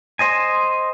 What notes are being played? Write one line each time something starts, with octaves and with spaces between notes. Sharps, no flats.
C5 D#5 G#5